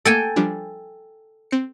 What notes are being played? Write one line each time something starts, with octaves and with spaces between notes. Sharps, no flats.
A3 A#3 A4 G5 G#5
F3 G3 D4
C4 C#7